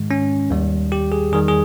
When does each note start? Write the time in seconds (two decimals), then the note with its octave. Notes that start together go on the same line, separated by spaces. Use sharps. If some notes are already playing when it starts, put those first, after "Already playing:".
Already playing: G#2 D#3 G#3
0.11 C#4
0.50 D#2 D#3 G3
0.92 G4
1.12 G#4
1.32 E2 D#3 G3 G#4
1.48 G#4